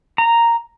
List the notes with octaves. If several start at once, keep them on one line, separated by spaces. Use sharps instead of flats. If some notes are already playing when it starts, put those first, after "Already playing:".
A#5